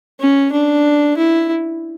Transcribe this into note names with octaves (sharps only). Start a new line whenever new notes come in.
C#4
D4
E4